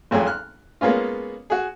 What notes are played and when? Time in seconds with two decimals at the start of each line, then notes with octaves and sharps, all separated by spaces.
0.11 G#1 F2 F#3 G#4
0.27 F6 F#6
0.81 G#3 A#3 B3 C#4 F4
1.50 F#4 G#4